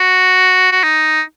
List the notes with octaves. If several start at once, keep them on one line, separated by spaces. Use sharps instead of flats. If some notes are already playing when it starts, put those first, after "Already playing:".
Already playing: F#4
F#4
D#4